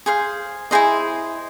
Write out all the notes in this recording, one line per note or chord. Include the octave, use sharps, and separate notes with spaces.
G#4 C5 F5
E4 G#4 C5 D#5